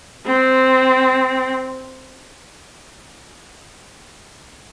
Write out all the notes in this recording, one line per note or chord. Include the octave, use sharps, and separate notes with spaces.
C4